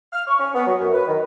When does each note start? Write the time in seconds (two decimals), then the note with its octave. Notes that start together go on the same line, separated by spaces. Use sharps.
0.13 F6
0.27 C#6
0.39 C#4
0.54 B3
0.67 F#3
0.79 F#2
0.94 B4
1.07 D#3